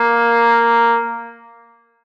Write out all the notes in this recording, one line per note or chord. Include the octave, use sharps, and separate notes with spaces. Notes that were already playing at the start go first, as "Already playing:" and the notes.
Already playing: A#3